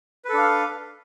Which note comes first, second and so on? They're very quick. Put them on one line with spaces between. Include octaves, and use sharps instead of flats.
B4 A4 D4 F5